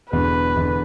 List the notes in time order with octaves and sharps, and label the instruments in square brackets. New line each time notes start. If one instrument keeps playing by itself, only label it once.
[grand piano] E1 E2 D3 [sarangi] B4
[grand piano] E1 E2 D3